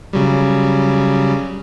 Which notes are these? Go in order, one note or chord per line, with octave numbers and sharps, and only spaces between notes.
C#3 F#3 G3